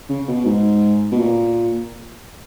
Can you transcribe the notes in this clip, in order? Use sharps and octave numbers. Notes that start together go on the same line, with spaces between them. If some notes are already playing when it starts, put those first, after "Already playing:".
C#3
B2
G#2
B2
A#2